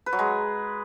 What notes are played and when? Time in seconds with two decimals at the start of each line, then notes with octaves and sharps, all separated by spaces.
0.06 B4
0.13 F#3
0.19 G#3